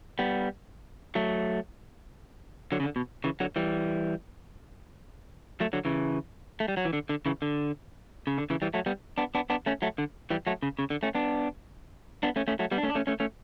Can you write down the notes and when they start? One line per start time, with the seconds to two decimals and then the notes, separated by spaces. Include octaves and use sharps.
0.19 G3 B3
1.15 F#3 A3
2.72 D3 F#3
2.80 C#3
2.83 D3
2.96 B2
3.24 C#3 E3
3.40 D3 F#3
3.56 E3 G3
5.60 F#3 A3
5.73 D3 F#3
5.85 C#3 E3
6.60 A3
6.68 G3
6.77 F#3
6.85 E3
6.93 D3
7.09 D3
7.26 C#3 E3
7.42 D3
8.27 C#3
8.38 D3
8.50 C#3 E3
8.62 E3 G3
8.74 F#3 A3
8.86 G3 B3
9.18 B3 D4
9.35 B3 D4
9.50 B3 D4
9.66 A3 C#4
9.82 F#3 A3
9.98 D3
10.30 E3 G3
10.47 F#3 A3
10.63 C#3
10.79 C#3
10.90 D3
11.03 A3 C#4
11.15 B3 D4
12.23 B3 D4
12.36 A3 C#4
12.48 A3 C#4
12.59 F#3 A3
12.71 G3 B3
12.78 D4
12.83 A3 C#4
12.90 D4
12.95 A3 C#4
13.07 A3 C#4
13.20 A3 C#4